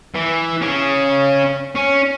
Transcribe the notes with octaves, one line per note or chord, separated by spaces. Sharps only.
E3
C#4 G#4
C#4